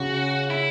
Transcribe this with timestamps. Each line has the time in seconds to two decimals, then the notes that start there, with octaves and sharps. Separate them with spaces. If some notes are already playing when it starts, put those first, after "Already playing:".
Already playing: C#3 F#4
0.50 E4